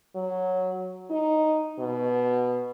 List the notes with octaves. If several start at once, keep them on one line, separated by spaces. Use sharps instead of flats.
F#3
D#4
B2